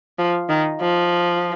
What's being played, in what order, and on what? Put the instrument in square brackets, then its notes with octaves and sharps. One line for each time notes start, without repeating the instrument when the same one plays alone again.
[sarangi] F3
D#3
F3